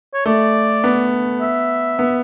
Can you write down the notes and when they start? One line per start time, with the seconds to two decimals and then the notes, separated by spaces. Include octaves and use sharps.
0.14 C#5
0.26 A3 D5
0.84 B3
1.41 E5
1.99 B3